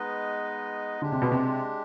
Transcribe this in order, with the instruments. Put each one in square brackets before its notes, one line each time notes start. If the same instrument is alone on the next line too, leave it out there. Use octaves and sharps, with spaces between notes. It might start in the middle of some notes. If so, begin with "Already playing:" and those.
Already playing: [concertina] G#3 B3 D#4 B4 D#5
[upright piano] D3 [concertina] G#3 D4 G4
[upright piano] C3
B2
C3